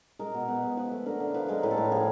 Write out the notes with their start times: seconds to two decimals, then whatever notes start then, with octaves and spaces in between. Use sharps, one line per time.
0.19 G#3 A#4
0.34 B2
0.48 B2 B4
0.63 G#3
0.77 F3 B4
0.91 A3
1.06 D3 A#4
1.20 D3
1.34 F3 B4
1.49 G#3 A#4
1.63 A2 B4
1.71 A4
1.77 A2 A#4
1.91 F3 G#4